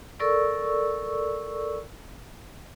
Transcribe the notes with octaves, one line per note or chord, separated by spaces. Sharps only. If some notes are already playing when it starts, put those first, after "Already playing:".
A4 A#4 D5 C#6 E6